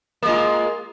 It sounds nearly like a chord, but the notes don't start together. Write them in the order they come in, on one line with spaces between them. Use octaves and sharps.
A#3 G#3 F4